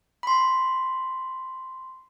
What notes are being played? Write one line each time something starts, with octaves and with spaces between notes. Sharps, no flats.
B5 C6